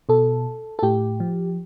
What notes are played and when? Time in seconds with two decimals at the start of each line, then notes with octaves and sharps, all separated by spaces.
0.09 B2 A4
0.79 A4
0.83 A2 G4
1.20 F3